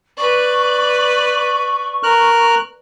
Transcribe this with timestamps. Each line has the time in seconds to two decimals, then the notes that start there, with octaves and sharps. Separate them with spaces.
0.17 B4 D5 C#6
2.03 A#4 F6 F#6